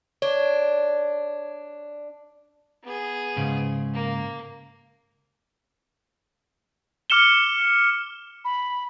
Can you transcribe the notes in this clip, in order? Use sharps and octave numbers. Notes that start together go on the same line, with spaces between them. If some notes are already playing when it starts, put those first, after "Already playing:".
D4 C#5
B3 G#4
G#2 C#3
A#3
D6 F6 C#7 E7 G7
B5